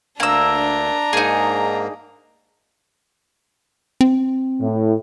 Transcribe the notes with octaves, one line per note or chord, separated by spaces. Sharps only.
D2 A#3 D4 A#5 E6
G#2 A#3 D#4 G#4
C4
A2